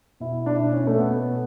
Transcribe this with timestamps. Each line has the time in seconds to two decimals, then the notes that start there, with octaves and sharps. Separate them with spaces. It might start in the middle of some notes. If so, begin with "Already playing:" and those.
0.20 B2 E4
0.46 D4
0.55 E4
0.59 B2 D4
0.72 C#4
0.87 A3
0.98 B2 B3